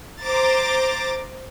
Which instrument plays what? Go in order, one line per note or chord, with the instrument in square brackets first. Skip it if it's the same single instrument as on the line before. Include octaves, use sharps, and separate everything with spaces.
[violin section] C5 A#5 D6 A6